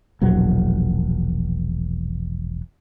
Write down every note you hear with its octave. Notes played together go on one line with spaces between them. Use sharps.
E1 A#1 F#3